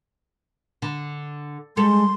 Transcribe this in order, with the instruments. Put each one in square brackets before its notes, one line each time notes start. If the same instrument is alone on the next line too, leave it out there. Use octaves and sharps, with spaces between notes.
[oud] D3
[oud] G3 A4 [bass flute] G#3 [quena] C6